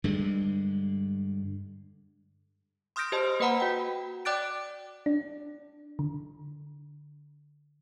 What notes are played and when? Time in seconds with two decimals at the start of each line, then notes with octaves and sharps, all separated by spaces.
0.04 G2 D3 G#3
2.96 C6 D#6 F6 G6 A#6 D7
3.12 G4 C5 D#5 A5
3.40 A#3 B4 D#5 F#5 A#5 B5
3.60 F#4 G5
4.25 D5 G5 D6 F#6 A6 D7
5.06 D4
5.99 D3